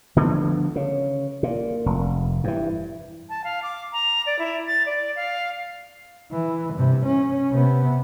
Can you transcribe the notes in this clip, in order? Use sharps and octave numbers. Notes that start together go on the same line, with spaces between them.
D3 F3 A3 B3
C#3
A#2
F1
G2 E3
A5
F5
D6
A#5
D5
E4
A6
D5
F5
E3
G2 C3
C#4
C3 B3